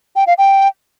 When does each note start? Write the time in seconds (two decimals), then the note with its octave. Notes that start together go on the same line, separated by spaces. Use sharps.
0.16 G5
0.27 F5
0.38 G5